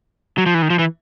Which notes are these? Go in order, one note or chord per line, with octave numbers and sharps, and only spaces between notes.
F#3
F3
E3
D#3
F3
E3